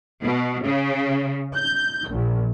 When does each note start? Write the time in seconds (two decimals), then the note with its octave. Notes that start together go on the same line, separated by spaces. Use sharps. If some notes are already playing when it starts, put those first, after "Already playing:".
0.22 B2
0.64 C#3
1.55 G6
2.10 A#1